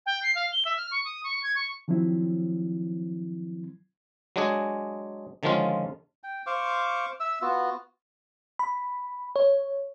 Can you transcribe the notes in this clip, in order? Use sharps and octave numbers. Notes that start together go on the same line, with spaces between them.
G5
C7
F5
G7
E5
F6
C#6
D#6
C#6
G#6
C#6
D#3 F3 F#3 C4 E4
F#3 G#3 D4 G#4
D3 D#3 F3 G#3 C#4 F4
G5
C5 F5 C#6 D6
E5 E6
B3 F4 F#4
B5
C#5